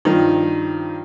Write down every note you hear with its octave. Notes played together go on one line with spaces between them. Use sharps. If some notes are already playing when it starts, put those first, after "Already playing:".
G2 D#3 F3 D#4